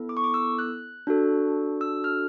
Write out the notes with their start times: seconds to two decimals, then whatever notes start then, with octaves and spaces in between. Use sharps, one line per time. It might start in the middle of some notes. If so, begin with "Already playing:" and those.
Already playing: B3 E4 A4
0.09 D6
0.17 C#6
0.24 D6
0.34 E6
0.59 F#6
1.07 D4 F#4 A4
1.81 E6
2.04 F6